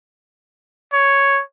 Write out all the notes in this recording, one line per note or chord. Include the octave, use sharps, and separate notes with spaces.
C#5